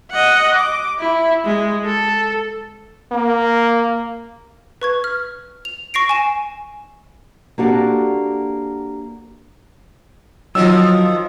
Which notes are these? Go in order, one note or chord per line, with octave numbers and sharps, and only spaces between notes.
D#5 F#5
D6
E4
G#3
A4
A#3
B4 C#6 G#6
F6
F7
C#6 A#6 C7 D7
G#5 E7
A#3 C4 D4 F#4 G4 A4
D#3 F3 F#3 F4 D#5 E6